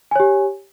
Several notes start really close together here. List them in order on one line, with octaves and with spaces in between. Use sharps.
G#5 C#5 G4